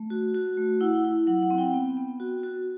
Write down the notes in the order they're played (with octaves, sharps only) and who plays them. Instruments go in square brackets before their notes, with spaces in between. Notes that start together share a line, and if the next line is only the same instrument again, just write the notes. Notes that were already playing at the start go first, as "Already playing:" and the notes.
Already playing: [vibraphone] A3
F#4
F#4
A3
E4 F#5
E4
F#3 F#5
F#5
C4
G5
B3
B3
F#4
F#4